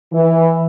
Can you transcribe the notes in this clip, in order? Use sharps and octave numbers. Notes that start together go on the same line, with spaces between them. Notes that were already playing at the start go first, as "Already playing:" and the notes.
E3